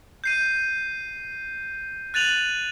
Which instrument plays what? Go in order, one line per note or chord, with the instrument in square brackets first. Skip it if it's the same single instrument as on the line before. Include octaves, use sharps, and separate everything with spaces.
[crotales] G6 C7 D#7
F#6 A6 D#7 F7 F#7